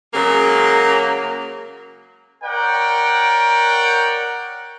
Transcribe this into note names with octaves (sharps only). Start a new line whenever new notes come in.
C#3 F#3 G#3 A#3
A#4 C#5 D5 F#5 G5